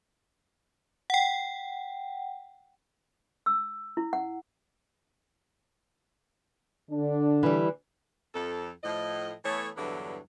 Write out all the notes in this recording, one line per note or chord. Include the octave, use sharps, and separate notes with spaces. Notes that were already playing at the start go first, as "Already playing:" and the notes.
F#5 G5
E6
E4
F#5
D3 D4
E3 G3
F2 A4
A2 F3 D#5
E3 A3 B3 A4 C#5
E2 G2 D3 E3 F#3 B3